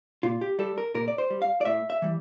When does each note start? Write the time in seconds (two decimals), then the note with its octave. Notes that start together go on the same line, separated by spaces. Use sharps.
0.23 A#2 F4
0.41 G4
0.59 G3 A4
0.78 A#4
0.95 A#2 A#4
1.08 D5
1.18 C5
1.30 G3
1.42 F5
1.61 D5
1.65 A2 E5
1.90 E5
2.02 E3 G3